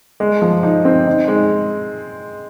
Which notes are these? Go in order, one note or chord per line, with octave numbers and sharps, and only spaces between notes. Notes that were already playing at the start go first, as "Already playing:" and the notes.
G#3
F3
D#4
C4
D#4
G#3